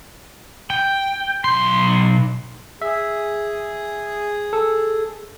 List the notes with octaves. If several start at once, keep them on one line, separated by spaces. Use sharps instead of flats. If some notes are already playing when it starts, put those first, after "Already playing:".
G5
B1 C6
G#4 E5
A4